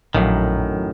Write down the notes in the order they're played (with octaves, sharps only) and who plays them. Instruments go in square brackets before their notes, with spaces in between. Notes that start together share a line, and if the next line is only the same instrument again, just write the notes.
[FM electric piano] A#1 [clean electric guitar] F#2 A2 D#3 [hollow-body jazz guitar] F#3 D4 F5